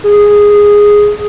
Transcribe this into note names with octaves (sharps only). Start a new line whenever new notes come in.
G#4
G#4